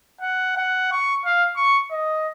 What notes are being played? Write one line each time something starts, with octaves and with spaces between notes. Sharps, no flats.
F#5
F#5
C#6
F5
C#6
D#5